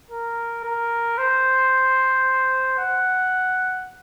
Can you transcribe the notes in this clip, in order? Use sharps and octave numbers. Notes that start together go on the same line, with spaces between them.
A#4
A#4
C5
F#5